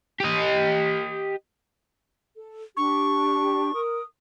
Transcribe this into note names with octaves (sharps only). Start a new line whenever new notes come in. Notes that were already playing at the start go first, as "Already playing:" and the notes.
G4 D#5
A4
D4 G4 C#6
A#4 D#6